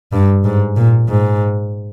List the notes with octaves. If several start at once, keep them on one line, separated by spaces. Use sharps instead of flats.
G2
G#2
A#2
G#2